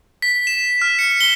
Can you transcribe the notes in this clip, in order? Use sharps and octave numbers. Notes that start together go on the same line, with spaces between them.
B6
E7
F6
C#7
G7